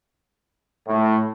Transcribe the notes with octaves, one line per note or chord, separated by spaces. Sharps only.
A2